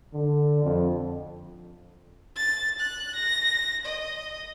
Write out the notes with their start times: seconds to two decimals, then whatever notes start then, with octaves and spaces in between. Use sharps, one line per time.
0.14 D3
0.63 F2
2.36 A6
2.79 F#6
3.15 A#6
3.85 D#5